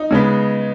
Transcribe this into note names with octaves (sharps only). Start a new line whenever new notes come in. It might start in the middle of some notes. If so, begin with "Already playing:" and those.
Already playing: D#4
C#3 G#3 B3